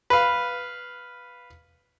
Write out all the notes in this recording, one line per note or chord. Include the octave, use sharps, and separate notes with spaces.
B4 F5